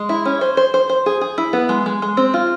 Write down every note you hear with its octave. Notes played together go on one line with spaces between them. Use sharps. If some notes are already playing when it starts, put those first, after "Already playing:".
Already playing: G#3
E4
C#4
C5
C5
C5
C5
G#4
G#4
E4
B3
G#3
G#3
G#3
C4
F4